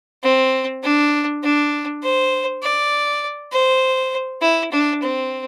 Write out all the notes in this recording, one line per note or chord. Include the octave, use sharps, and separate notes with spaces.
C4
D4
D4
C5
D5
C5
E4
D4
C4